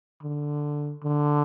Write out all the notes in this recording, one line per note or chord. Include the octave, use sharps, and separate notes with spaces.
D3
D3